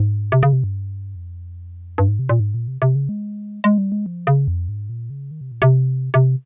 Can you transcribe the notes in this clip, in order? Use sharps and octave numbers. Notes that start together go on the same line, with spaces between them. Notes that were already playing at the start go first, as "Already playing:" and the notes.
Already playing: G#2
C3
C#3
C3
G2
F2
G2
G#2
C3
A#2
G#2
A#2
C3
C3
C#3
G#3
G#3
G3
G#3
F3
C#3
F2
G#2
A#2
C#3
D#3
C3
A#2
C3
C3